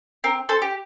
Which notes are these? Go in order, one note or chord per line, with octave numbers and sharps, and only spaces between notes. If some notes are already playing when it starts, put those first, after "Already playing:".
C4 A#4
A4 C5
G4